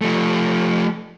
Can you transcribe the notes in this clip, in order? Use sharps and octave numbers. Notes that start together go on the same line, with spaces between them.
F3 A3